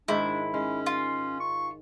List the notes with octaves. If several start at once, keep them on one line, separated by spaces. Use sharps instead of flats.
G#2 D#3 D4 E4
G#3 C#4
F4
C#6